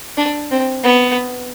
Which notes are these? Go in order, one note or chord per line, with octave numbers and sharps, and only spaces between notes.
D4
C4
B3